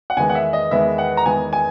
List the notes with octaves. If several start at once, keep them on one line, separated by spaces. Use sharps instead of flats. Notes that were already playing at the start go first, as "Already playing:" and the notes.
F#5
E2 D#3 G#3 B3 G#5
F#5
E5
D#5
E2 D#3 G#3 B3 E5
F#5
A#5
E2 D#3 G#3 B3 G#5
G#5